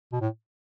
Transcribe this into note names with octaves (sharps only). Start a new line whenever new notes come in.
B2
A2